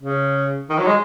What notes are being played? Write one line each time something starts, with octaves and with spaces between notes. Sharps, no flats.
C#3
D#3
F#3
G#3